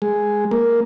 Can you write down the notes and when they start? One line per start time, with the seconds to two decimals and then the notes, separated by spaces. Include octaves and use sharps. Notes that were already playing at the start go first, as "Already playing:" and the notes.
0.02 G#3
0.51 A#3